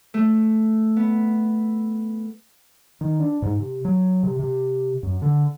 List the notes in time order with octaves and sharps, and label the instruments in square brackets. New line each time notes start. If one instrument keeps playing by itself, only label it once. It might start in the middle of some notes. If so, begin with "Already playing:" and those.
[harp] A3
B3
[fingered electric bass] D#3
D4
G#2
C3
F#3
C3
C3
F#2
D3